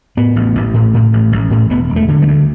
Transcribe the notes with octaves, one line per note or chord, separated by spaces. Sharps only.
A2 B3
A1
A1
A2
A2
A1
A1
A2
E1 B3
E1
A3
D3
G3
D2